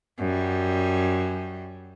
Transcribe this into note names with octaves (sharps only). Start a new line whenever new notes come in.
F#2 G3